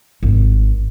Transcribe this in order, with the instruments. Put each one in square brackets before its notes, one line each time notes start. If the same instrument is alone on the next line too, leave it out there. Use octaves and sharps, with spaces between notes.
[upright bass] G#1